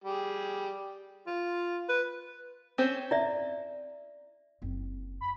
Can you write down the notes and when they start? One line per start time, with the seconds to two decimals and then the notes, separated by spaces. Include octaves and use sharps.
0.04 G3 G4 G#4
1.27 F4
1.89 B4
2.78 C4 C#4 C5
3.11 E4 D5 E5
4.62 F#1 C4
5.21 B5